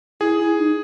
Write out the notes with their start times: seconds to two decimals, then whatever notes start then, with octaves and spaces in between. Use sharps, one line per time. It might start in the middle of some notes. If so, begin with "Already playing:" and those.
0.21 E4 G#4
0.39 E4
0.58 D#4